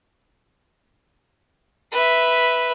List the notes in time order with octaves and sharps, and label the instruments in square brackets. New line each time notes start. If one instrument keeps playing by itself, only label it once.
[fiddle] B4 E5